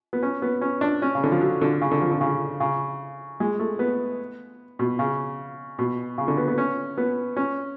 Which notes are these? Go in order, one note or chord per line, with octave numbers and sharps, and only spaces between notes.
B3
C#4
B3
C#4
D4
C#4
C#3
D3
F3
F#3
D3
C#3
D3
F3
D3
C#3
C#3
G#3
A3
B3
B2
C#3
B2
C#3
D3
B3
B3
C#4
B3
C#4